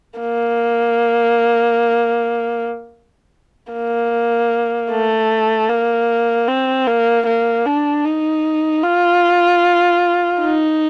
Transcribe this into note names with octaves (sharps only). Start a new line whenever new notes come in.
A#3
A#3
A3
A#3
C4
A#3
A#3
D4
D#4
F4
D#4